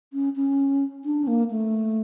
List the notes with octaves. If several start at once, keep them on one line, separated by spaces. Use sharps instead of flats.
C#4
C#4
D4
C#4
A#3
A3